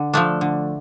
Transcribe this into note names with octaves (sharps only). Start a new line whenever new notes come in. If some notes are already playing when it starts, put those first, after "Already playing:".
Already playing: D3
F3 A3 D4
D3